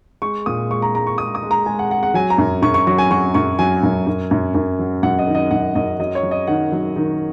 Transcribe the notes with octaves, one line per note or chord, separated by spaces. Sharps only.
G#3 C#6
A#2 D#6
G#3 C#6
A#5
G#3 A#5
C#6
G#3 D#6
D#6
G#3
A#5
G#3 G#5
F#5
G#3 F#5
F#5
F#3 G#5
A#5
F#2
F#2 C#6
C#6
F#3 C#6
G#5
F#3 C#6
F#2 C#6
F#3 G#5
F#2
F#2
F#2
F#2
F#3
F#2 F#5
D#5
D#3
D#5
F#2 F#5
F#2 D#5
F#3 D#5
C#5
F#3
D#5
D#3 F#5
F#3
D#3